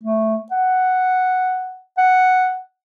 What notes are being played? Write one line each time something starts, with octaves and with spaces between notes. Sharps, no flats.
A3
F#5
F#5